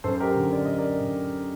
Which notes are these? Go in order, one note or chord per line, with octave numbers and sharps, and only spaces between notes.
F#2 A4 C5
G4 A#4
D3
D5
F#2 D#5
A#4 D5
D3